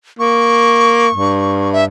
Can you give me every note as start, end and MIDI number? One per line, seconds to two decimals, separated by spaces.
0.19 1.09 58
0.19 1.72 85
1.15 1.86 43
1.73 1.84 76